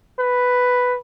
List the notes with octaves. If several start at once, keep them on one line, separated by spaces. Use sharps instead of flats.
B4